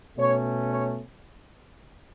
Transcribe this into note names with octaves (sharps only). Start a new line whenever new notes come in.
B2 A3 C#4 C#5
C#5